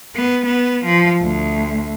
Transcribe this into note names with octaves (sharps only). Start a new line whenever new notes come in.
B3
B3
F3
D2